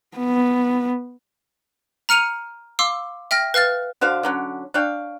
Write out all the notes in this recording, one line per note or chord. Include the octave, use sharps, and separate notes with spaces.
B3
A#5 F6 C#7 D#7 F7
F5 C6 D6 E6
E5 G5 F6 A#6
B4 F5 F6 A6
D3 F#4 C5 F5
D3 F#3 C#4
D4 C#5 F5 G5